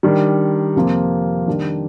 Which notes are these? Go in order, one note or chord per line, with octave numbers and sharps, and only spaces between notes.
D#3 G3 D4
F2 C3 F3 A#3 F4
D#3 G3 D4